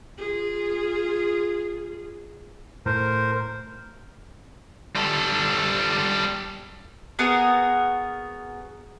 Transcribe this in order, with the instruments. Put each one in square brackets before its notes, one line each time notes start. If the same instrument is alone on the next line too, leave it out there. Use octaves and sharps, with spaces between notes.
[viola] F4 G#4
[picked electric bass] A2 [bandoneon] A#4 C5
[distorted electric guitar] G3 A4
[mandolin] B3 F#4 G#4 A#4